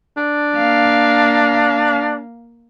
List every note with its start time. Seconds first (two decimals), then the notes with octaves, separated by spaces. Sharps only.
0.17 D4
0.56 A#3 F5